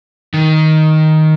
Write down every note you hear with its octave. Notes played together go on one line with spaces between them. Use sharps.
D#3